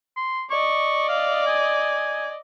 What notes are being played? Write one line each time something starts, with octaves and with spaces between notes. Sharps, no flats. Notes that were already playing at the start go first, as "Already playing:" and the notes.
C6
D5 D#5 C#6
F5
G#5